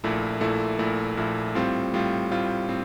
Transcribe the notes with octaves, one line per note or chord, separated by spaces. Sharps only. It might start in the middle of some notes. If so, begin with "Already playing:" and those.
A#1 A#2 A3 E4
A#1 A#2 A3 E4
A#1 A#2 A3 E4
A#1 A#2 A3 E4
A2 G3 C4 F4
A2 G3 C4 F4
A2 G3 C4 F4
A2 C4